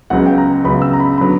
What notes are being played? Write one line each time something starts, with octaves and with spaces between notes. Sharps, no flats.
C#2 C#3 F#3 B3 F#5
G5
A#5
C#2 C#3 F#3 B3 B5
E6
A#5
B5
D3 F#3 B3 B5